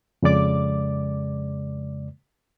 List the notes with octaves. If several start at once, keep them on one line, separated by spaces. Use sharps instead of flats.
F2 C#3 G#3 D5 D6